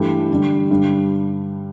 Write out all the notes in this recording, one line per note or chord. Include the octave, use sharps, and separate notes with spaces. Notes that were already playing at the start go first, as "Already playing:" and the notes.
Already playing: G2 E3 A3 G4
D3 G3 D4
G2 D3 G3